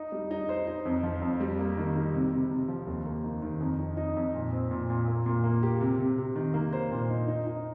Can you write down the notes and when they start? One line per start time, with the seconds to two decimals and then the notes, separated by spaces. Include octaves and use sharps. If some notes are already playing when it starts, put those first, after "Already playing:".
Already playing: D#4
0.12 G3
0.31 D#4
0.49 C5
0.67 D#4
0.85 F2
1.03 F3
1.21 F2
1.40 G3
1.59 A#3
1.77 D#3
1.96 G3
2.14 C3
2.32 C3
2.51 C3
2.68 F3
2.87 D#2
3.05 A#3
3.24 D#3
3.42 D#3
3.60 F2
3.79 D#4
3.97 D#4
4.16 F2
4.34 A#2
4.53 C4
4.71 A#2
4.90 A#2
5.07 A#3
5.26 A#2
5.44 A#3
5.63 G4
5.81 C3
5.99 C3
6.18 C3
6.36 D#3
6.54 A#3
6.73 C5
6.91 A#2
7.10 D#4
7.28 D#4
7.47 D#4